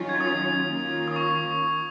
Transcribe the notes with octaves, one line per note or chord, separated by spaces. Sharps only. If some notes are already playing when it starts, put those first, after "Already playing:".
Already playing: D#3 F#3 C#4 F4
G#6
D#6
D#3 A#3 C#4 F4
D#6
C#6